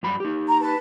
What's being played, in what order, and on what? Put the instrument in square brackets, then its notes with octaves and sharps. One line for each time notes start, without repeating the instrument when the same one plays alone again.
[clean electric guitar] G2 F#3 B5
D#4 G4
[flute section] A#5
B4 A5